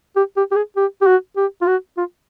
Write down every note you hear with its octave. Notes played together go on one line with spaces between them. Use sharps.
G4
G4
G4
G#4
G4
G4
F#4
G4
F4
F#4
F4